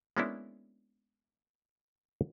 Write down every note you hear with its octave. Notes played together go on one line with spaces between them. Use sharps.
G#3 A#3 B3 C#4 D4 E4